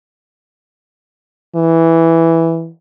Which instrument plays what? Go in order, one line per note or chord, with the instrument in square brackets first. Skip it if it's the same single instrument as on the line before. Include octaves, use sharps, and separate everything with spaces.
[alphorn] E3